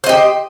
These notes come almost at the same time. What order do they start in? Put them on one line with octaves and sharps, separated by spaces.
C5 D#5 G4